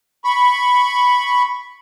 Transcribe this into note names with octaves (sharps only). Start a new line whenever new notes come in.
B5 C#6